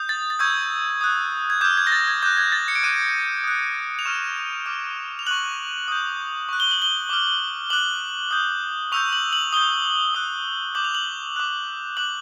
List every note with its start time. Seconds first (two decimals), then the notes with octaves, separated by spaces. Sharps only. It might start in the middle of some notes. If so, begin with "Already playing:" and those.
Already playing: D#6 G6
0.09 A6
0.30 A6
0.39 C#6 E6 G6 G#6
1.01 D#6 F#6
1.50 G#6
1.61 D6 F6 G6
1.77 G#6
1.87 A#6
1.92 A6
2.08 G#6
2.23 D6 F#6 G6
2.37 G#6
2.52 A6
2.68 C#7
2.75 D7
2.84 D6 F#6 D#7
3.44 D#6 F#6
3.99 F7
4.05 C#6 F6 E7
4.66 D6 F6
5.19 F7
5.27 C#6 F#6 F#7
5.88 D#6 G6
6.49 C#6 F#6
6.60 G7
6.71 F#7
6.82 G7
7.09 D6 F6
7.70 D6 F#6 F#7
8.31 D#6 G6
8.92 C#6 E6 G6 F7
9.13 F#7
9.33 F#7
9.53 D#6 G6 G7
10.15 D#6 F#6
10.75 D6 G6 F#7
10.85 F7
10.95 F#7
11.36 D6 F#6
11.97 D6 F#6 F#7